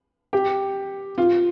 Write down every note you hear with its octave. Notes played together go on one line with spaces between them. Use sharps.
G4
F4